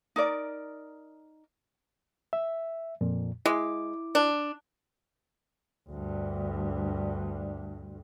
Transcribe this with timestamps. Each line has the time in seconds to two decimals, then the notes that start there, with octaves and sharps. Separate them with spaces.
0.16 D#4 A#4 D5
2.33 E5
3.01 F2 A#2
3.46 G#3 E4 D6
4.15 D4
5.90 D2 G2